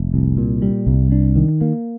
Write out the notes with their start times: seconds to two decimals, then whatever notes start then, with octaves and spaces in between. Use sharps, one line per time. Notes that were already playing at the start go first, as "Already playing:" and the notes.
Already playing: F1
0.14 C2
0.38 A#2
0.62 G3
0.87 C2
1.12 D4
1.36 D#3
1.61 A#3